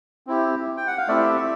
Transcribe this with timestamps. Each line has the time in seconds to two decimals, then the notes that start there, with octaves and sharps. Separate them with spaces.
0.27 C4 E4 G4
0.77 G5
0.87 F#5
0.98 F5
1.08 A3 C4 E4 G4 D5 E5